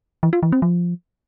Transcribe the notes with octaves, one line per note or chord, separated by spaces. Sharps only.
E3
F4
E3
C4
F3